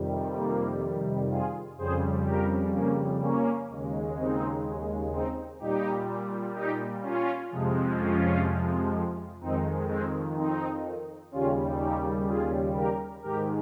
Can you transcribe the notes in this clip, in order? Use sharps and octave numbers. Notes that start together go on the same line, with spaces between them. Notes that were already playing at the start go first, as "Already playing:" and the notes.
Already playing: F2 C3 D#3 G3
A#3
F4 G#4
F2 C#3 G3 G#4 C5
G4 A#4
A#3 C#4
A#3 C#4
D#2 C#3 G#3
C4 D#4
C4 D#4
A#2 G3 D#4 G4
D#4 G4
C#4 F4
F2 C3 F3 G#3
C#4 F4
F2 D#3 G#3 C4 D#4
G#3 C4
C4 D#4
D#2 C#3 G3 C#4 F4
D#4 G4
F4 G#4
G4 A#4
G#2 D#3 G#3 G4 A#4